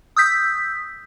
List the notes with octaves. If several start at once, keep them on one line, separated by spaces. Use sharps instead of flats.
D#6 E6 G6 B6